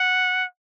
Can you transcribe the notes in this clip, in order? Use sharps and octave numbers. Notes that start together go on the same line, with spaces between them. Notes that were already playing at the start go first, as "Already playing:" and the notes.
Already playing: F#5